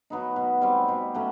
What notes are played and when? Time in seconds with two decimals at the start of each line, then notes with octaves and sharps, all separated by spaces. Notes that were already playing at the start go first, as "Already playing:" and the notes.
0.10 F#3 B3 D#4
0.36 B2
0.61 G3 C4
0.88 B2
1.14 F#3 A3 C#4